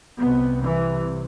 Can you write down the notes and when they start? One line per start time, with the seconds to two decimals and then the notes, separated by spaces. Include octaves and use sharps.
0.20 C2 C3 B3
0.63 E3